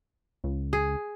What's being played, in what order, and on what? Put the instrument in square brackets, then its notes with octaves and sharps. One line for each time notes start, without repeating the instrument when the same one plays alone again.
[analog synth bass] C#2
[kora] G#4